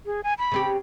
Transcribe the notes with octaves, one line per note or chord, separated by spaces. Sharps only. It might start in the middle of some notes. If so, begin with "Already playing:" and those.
G#4
G#5
B5
C#3 C4 G4